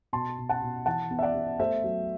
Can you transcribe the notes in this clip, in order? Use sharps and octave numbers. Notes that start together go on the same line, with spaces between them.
B2 A5 C6
B2
F#5 A5
B2
E3 F#5 A5
B3
E5
D5 F#5
B3
A3 C5 E5
F#3